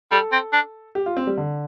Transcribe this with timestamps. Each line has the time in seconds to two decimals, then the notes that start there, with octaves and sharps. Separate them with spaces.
0.11 G3 A4
0.32 C4
0.53 D4
0.95 G4
1.06 F4
1.17 C4
1.27 G3
1.37 D3